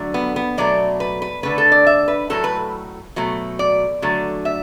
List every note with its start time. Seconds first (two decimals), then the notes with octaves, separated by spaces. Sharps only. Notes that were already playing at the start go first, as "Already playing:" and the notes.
Already playing: D3 F#3 A3
0.14 B3
0.36 B3
0.57 B2 F#3 A3 D5
1.00 B4
1.22 B4
1.43 D3 A3 B4
1.58 A4
1.72 D5
1.87 E5
2.08 B4
2.30 A2 F#3 A3 A4
2.44 B4
3.16 B2 F#3 A3
3.59 D5
4.02 D3 F#3 A3
4.45 E5